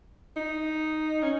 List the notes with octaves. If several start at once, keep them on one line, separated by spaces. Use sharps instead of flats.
D#4
C#4